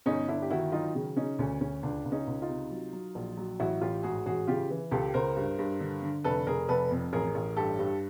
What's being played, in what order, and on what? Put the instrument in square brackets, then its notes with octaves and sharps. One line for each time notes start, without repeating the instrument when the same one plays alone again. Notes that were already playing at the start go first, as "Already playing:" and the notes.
[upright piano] G1 C#4 D#4
G1 D4 E4
G4
D#3 E4 F#4
F#3 D#4 F4
C#3
C#3 C#4 D#4
D2 C#4
D2 C#4
C#2 D4
C#2
C#4 D#4
C#2
D#4 F4
C3
F#3
F#3
A#1
F#3
A1 E4 F#4
A1 F4 G4
G#2 F#4 G#4
A1 F#4 G#4
C#3 F4 G4
E3
C#2 G4 A4
C#2 A#4 C5
G2
G2
D3
D3
F1 A4 B4
F1 G#4 A#4
F1 A4 B4
F2
A1 G#4 A#4
A1
G2 G4 A4
G2